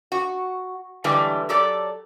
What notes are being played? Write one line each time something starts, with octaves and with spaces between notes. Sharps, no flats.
F#4
A2 D3 E3 G3 G#3
F#3 G4 A4 D5